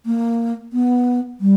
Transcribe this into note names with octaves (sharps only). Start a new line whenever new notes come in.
A#3
B3
G3